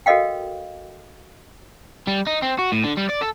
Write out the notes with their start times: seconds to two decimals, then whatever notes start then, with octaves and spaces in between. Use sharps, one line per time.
0.06 F#4 A4 A#4 D#5 F5 G5
2.07 G3
2.27 D#4
2.42 C4
2.59 F#4
2.72 A2
2.84 D3
2.97 G3
3.09 D5
3.21 A4